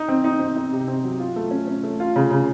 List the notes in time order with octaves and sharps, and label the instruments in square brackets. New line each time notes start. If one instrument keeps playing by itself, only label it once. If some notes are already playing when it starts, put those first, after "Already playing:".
Already playing: [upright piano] D#4
C4
D#4
C4
D#4
C3
C4
F#3
F4
A3
C#4
C#4
A3
F4
C#3
C#3